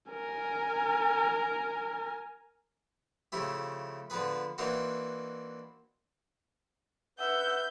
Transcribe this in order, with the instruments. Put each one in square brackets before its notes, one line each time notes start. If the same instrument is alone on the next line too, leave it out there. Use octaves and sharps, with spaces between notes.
[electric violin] A#4 G#5
[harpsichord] C#3 F3 A3 E4 G4
D3 F3 B3 G#4 B4
E3 A#3 C4 D4 D#4 F#4
[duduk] B4 [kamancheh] E5 E6 [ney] F#5 [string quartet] G6